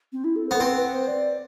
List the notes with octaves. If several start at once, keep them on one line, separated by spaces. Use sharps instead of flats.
C4
E4
A4
B3 C5
A4
C4 B4
B4
C5
D5